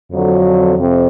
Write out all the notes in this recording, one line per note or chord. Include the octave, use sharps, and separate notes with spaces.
F2 D3 F#3
F2 C3